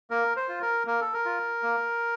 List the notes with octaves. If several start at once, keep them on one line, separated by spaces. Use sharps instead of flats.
A#3 A#4
C5
F4
A#4
A#3 A#4
A4
A#4
F4
A#3